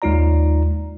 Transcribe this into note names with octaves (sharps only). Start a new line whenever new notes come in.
D#2 G#3 D#4 F4 D5 A#5